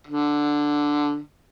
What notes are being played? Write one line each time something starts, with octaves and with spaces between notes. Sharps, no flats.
D3